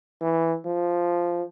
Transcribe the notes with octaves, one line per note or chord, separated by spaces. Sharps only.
E3
F3